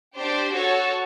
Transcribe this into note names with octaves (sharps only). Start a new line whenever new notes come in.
D4 G4 C5
F#4 A4 C#5